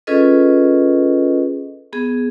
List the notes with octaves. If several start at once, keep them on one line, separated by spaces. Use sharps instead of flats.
C#4 F4 G#4 A4 B4 D#5
B3 G#4